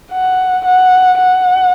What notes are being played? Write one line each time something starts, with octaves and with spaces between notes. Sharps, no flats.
F#5
F#5
F#5